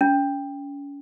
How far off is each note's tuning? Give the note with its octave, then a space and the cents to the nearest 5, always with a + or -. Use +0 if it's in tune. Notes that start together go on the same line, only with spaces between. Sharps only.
C#4 +35